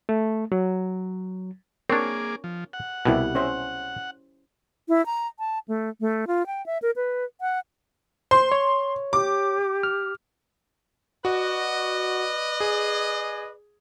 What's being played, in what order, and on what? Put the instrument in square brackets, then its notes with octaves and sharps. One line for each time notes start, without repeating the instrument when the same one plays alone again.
[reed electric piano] A3
F#3
[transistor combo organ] A#3 G#4 D6 [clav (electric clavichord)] C4 D4 [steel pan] A#4 C#5
[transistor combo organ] F3
F#5
[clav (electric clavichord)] C2 B2 [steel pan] E4 G4 G5
[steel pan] C#4 C5 E5
[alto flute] E4
A#5
A5
A3
A3
F4
G5
E5
A#4
B4
F#5
[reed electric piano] C5 [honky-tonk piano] C6
[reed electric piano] C#5
[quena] G4 [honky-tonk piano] D6
[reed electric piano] F6
[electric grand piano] F#4 [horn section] B4 D5 D#5
[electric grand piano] G#4